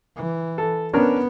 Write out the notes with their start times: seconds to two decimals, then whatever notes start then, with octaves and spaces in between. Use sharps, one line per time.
0.16 E3
0.58 A4
0.93 B3 C#4 D4 A#4